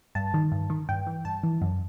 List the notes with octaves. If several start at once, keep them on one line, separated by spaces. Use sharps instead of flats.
G2 A5
D#3
G2
D#3
G2 G5
E3
G2 A5
E3
F#2